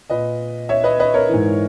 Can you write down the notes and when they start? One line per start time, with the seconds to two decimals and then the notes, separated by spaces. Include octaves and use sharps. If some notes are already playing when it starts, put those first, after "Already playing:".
0.10 A#2 B4 D#5
0.69 C#5 E5
0.84 B4 D#5
0.99 B4 D#5
1.14 A#4 C#5
1.29 G#2 E3